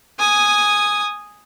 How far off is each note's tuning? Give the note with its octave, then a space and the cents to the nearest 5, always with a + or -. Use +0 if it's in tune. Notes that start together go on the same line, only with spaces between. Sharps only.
G#5 +0 D#6 -5